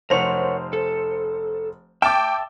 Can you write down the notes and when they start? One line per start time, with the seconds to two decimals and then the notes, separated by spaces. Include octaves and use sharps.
0.10 F1 A#4 C5 C#5 F#5 F7
0.73 A4
2.02 E5 G5 A5 D6